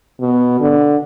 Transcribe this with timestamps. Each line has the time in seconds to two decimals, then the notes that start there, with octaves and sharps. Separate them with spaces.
0.21 B2
0.60 D3